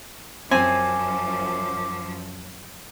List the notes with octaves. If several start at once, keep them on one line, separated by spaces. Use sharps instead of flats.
F#2 F3 C4 G#5 D6